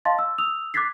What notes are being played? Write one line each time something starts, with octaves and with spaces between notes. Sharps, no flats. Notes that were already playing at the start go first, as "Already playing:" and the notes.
D#5 F5 A5 C6 A6
E6
D#6 E6 F7
D6 F#6 G#6 A6 B6 C7